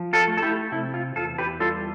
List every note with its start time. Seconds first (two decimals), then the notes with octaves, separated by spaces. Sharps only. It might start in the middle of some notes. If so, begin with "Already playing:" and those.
Already playing: F3
0.13 F4 A4
0.28 A3
0.37 A4
0.42 E4 G4
0.72 C3 E4
0.94 F4
1.16 E2 F4 A4
1.38 G4 B4
1.60 G3 F4 A4